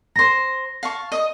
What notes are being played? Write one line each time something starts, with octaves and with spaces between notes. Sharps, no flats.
C5 A#5 A#6
F5 A5 C#6
D#5 D#6